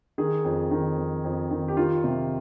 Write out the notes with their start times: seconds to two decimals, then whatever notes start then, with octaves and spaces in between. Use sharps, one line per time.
0.18 D#3 G#4
0.45 F2
0.71 D#3
0.98 F2
1.24 F2
1.51 D#3
1.68 G4
1.77 D#3 F4
2.04 C3